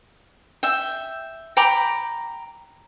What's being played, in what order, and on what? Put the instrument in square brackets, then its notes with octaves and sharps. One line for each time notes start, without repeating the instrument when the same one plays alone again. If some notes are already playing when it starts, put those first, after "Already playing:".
[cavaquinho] E5 G5
G5 A#5 B5 D6